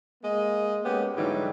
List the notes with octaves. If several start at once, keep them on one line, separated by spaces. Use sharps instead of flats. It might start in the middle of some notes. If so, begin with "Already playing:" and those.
G#3 A#3 D#5
G#3 A#3 B3 C#4 G4
G#2 D3 E3 F#3 G3